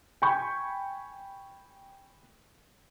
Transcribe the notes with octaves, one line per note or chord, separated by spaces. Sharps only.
G5 G#5 B5 C#6 G6